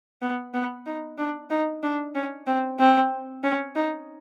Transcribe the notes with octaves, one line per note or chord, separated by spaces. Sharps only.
B3
B3
D#4
D4
D#4
D4
C#4
C4
C4
C#4
D#4